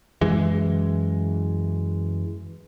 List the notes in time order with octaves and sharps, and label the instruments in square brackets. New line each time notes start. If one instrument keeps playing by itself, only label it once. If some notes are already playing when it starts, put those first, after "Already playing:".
[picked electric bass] F#2 E3 G#3